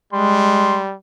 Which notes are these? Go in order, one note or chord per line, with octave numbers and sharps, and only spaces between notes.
G3 G#3 C6